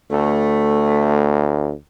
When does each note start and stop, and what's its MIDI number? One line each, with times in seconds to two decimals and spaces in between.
0.11 1.73 38
0.11 1.51 57